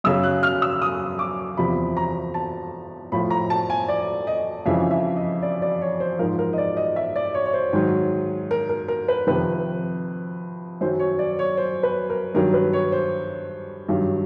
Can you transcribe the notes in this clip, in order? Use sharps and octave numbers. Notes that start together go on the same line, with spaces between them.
F#2 C#3 F#3 E6
F#6
F6
E6
D#6
D6
E2 C3 F3 B5
A#5
A5
A2 F3 B5
A#5
A5
G#5
D5
D#5
F2 C#3 E3 E5
E5
D#5
D5
D5
C#5
C5
G#2 F3 A#4
A#4
D#5
D5
D#5
E5
D5
C#5
C#5
C5
G#2 D#3 F#3
A#4
A#4
A#4
B4
F2 C3 D#3 B4
F#2 D#3 F#3 C5
C#5
D5
C#5
C5
B4
A#4
G2 D#3 F#3 A#4
B4
C#5
C5
G2 D#3 F#3